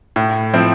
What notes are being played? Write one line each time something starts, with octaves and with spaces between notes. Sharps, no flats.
A2
F3 C4 E4